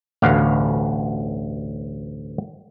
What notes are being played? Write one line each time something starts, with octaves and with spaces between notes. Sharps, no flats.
A1 D2 B2 F5 F#5